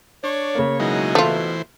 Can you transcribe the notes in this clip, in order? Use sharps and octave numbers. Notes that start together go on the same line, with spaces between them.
D4 C#5
C#3 A#3
B2 F#3 G#3 D#4 E4
E3 A3 F4 C5